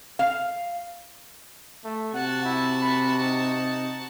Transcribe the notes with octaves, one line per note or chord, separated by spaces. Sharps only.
F5
A3
C3 F#4 F#5 A5
E4
B5
D#4